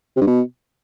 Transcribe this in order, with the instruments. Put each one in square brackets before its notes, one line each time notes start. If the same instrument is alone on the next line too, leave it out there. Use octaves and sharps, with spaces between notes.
[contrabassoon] C3
G2
B2